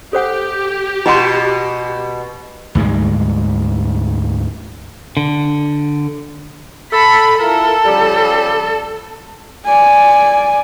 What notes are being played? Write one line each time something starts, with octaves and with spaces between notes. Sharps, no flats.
G4 A4 C5 F#5
B2 F4 F#5 C6
D2 G#2 G3 G#3
D3
A4 B5
E4 F4 A4 A#4
C#3 F3 G3
D5 G#5